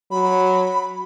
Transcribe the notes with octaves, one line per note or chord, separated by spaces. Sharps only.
F#3 B5